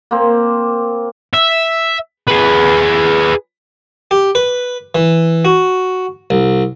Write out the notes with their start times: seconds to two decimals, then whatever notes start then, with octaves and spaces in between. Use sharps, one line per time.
0.11 A#3 C4
1.33 E5
2.27 G#4 B4
4.11 G4
4.35 B4
4.95 E3
5.45 F#4
6.30 C2